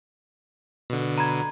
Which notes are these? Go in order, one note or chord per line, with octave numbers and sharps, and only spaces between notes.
B2 D3
A#5 B5 G#6